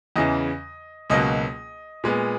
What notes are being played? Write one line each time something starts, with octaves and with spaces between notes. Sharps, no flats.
E2 C#3 E3 D#5
C#2 B2 F#3 A#3 D#5
A#2 G#3 B3